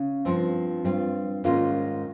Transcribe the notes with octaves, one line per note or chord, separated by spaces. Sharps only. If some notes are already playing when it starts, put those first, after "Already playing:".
Already playing: C#3
G2 F3 C4
G2 G3 C4 F4
G#2 D#3 A#3 C#4 F4